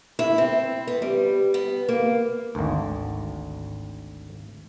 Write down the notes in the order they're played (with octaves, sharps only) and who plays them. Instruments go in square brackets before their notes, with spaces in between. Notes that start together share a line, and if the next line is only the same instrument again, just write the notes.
[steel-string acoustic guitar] E4
C4
B3
G3
B3
A#3
[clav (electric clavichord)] G#1 D2